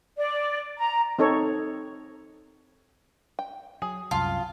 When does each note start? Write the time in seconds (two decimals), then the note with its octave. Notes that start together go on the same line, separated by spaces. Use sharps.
0.18 D5
0.77 A#5
1.19 C4 D#4 A4 C#5
3.39 G5
3.82 F#3 G#4
4.11 C2 F#2 F4 A5